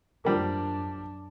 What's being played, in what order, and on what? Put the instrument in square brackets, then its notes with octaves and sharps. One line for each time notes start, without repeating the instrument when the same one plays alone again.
[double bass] F#2 D4 [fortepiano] F3 G3 A#3